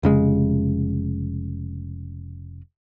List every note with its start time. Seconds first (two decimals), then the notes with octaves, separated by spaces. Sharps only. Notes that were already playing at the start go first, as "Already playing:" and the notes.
0.03 F1 C#3 G#3